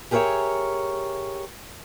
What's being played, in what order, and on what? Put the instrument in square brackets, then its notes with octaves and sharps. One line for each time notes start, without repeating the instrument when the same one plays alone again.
[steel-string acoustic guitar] G4 G#4 A#4 B4 C#5 E5